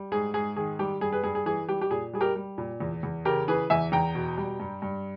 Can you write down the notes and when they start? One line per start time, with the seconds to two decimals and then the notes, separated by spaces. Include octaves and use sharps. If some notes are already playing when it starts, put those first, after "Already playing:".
Already playing: G3
0.12 G#2 G#4
0.34 G#2 G#4
0.56 D#3 G#4
0.79 G3 G4
1.01 G2 G#4
1.12 G#4 B4
1.24 G2 G#4
1.35 G#4
1.46 E3 G#4
1.69 G3 G4
1.81 G4
1.91 A#2 G#4
2.13 G3 G#4
2.21 G4 A#4
2.35 G3
2.58 A#2
2.80 E2
3.03 E2
3.25 C#3 G4 A#4
3.48 E3 G#4 B4
3.70 E2 E5 G#5
3.92 E2 G5 A#5
4.15 B2
4.38 G3
4.60 G2
4.82 G2